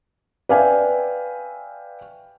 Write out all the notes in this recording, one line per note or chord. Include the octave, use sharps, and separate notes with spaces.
B4 D5 E5 F5 G5 G#5